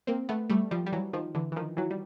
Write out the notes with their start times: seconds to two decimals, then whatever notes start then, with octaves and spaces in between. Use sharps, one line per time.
0.07 A#3 C4
0.29 A3 B3
0.50 G3 A3
0.71 F3 G3
0.86 G3
0.92 E3 F#3
1.13 D#3 F3
1.35 D3 E3
1.52 E3
1.56 D#3 F3
1.77 E3 F#3
1.91 G3